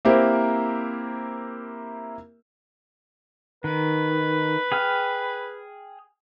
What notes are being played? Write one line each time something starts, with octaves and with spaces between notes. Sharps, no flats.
A#3 C4 E4 G4 A#4 C5
D#3 B4
G#4 G5 F6